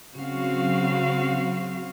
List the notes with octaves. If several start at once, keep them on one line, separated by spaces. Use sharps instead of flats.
C#3 F#3 C4 F#4 F5